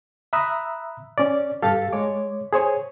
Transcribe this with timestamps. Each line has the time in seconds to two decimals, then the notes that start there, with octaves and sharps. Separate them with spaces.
0.33 E5 A#5 B5 D#6 E6 F#6
1.18 C#4 D5
1.62 G2 G4 A4 F5 A6
1.93 G#3 C#5 D6
2.53 G#4 C5 C#5 G#5